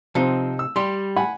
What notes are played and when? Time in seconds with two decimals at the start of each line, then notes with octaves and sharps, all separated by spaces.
0.15 C3 F3 C4 D#4
0.59 E6
0.76 G3 G4 C6
1.16 F#5 G#5 B5